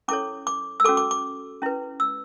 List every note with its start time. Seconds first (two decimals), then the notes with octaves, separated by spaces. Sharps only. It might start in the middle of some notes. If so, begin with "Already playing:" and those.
0.08 C#4 E4 A4 C#5 D6
0.47 D6
0.80 E6
0.85 C#4 F#4 A4 D6
0.97 D6
1.11 D6
1.62 C#4 E4 B4
2.00 E6